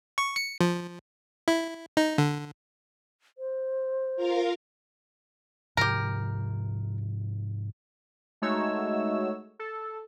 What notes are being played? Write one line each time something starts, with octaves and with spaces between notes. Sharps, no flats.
C#6
C#7
F3
E4
D#4
D3
C5
F4 A#4 F5
G#2 C3 F3 G4 A#4
G#3 A3 D#4 F#4 C#5 E6
A4